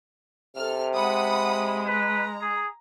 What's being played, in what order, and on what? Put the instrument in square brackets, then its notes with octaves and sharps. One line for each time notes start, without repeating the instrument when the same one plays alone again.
[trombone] C3 [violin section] A4 F6
[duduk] G#3 [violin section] F#5 B5 D#6
[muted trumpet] B4 [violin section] A#5
[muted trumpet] G#4